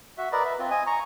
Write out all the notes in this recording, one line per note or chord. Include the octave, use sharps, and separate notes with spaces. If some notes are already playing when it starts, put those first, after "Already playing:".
F#4 E5
A#4 B4 D5 D#5
B4 E5
C4 F4
D#5 G#5
A#5 C#6